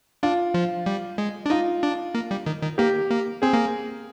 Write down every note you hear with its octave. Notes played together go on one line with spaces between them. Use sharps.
D4 F4
F3
G3
G#3
D4
D#4 F4
D4
A#3
G3
D#3
D#3
A#3 G4
A#3
C4 G#4
A#3